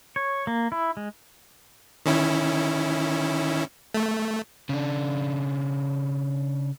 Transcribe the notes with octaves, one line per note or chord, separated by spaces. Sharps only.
C#5
A#3
E4
G#3
D#3 C#4 E4
A3
C#3 D4